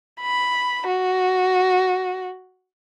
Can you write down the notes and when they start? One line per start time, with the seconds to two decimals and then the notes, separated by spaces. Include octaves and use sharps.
0.21 B5
0.88 F#4